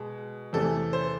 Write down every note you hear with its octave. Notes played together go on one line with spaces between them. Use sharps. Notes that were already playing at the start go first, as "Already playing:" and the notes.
Already playing: B2 G#3
E2 C3 E3 A3 A4
C5